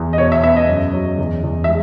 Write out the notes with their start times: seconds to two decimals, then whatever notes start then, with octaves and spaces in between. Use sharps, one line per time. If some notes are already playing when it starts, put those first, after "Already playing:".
Already playing: E2
0.13 D#5
0.18 B2 C#5
0.32 E5
0.43 B3 E5
0.56 D#5
0.69 F#2
0.93 F#3
1.18 E2
1.43 E2
1.64 E5
1.68 G#3